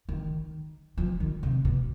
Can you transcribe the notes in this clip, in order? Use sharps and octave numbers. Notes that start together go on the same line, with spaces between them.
D#3
F3
D#3
C3
B2